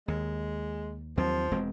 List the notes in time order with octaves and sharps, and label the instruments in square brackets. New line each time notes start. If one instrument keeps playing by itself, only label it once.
[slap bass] D#2 [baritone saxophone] G#3
[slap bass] D#2 F#3 C4 [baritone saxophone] F3
[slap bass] E1 G#3 C4